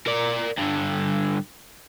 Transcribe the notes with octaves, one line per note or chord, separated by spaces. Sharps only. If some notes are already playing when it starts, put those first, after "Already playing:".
A#4 D5
G2 D3